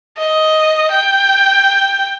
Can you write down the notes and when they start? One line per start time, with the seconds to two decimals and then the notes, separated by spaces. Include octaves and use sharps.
0.17 D#5
0.91 G5